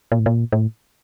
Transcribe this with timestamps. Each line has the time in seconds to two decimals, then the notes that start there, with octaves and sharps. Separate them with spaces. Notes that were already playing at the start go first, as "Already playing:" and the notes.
0.12 A#2
0.19 A2
0.26 A#2
0.52 A2